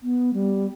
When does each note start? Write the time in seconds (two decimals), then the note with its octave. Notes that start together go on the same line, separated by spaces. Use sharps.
0.03 B3
0.34 G3